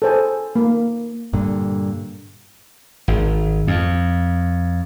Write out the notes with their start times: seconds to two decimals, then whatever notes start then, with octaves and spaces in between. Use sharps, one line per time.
0.02 A4 C5 G#5
0.56 A#3
1.33 G2 A#2 D3
3.08 G#1
3.68 F2